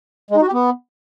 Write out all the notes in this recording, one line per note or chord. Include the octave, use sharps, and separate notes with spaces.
G#3
D#4
F#4
G4
B3